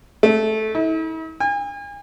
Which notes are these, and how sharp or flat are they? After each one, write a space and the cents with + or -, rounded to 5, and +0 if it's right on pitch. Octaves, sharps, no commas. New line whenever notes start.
A3 -15
E4 -45
G#5 -40